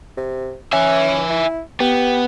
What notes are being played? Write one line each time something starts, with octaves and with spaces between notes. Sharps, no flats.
C3
C#4 E5 G#5
E4
B3 G4